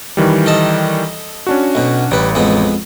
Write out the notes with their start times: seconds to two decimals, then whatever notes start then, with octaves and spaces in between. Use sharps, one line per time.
0.17 D#3 E3 G3
0.46 A4 D#5 A5
1.47 C#4 D4 F#4
1.75 B1 B2
2.11 A1 G3 B4
2.35 F2 G#3 B3